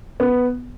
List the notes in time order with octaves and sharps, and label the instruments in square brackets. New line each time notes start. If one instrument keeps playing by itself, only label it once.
[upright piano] B3